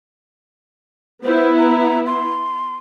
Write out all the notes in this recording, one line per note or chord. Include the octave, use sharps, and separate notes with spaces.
B3 E4 C5
A#5
C6